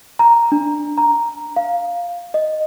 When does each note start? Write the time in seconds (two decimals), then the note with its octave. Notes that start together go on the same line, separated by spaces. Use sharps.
0.19 A#5
0.52 D4
0.98 A#5
1.56 F5
2.34 D#5